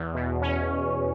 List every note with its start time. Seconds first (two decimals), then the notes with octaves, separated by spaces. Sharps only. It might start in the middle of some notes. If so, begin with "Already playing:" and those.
Already playing: E2
0.15 B2
0.41 C#4